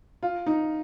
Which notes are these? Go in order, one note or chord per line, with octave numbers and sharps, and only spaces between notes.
F4
D#4